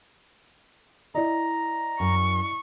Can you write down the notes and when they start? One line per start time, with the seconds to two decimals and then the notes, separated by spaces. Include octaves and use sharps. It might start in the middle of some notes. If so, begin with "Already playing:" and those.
1.15 E4 D5 D#5 A#5
2.00 F#2 C#6